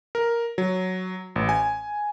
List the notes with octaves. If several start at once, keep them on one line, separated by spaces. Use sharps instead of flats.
A#4
F#3
A1
G#5